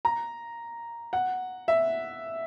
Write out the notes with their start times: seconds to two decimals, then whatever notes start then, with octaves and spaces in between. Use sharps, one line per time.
0.05 A#5
1.13 F#5
1.68 E5